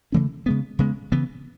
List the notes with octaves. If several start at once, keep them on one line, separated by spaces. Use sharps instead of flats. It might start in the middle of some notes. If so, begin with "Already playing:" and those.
C#3 E3 A3 C#4
C#3 G#3 B3
C#3 G#3 B3
C#3 E3 B3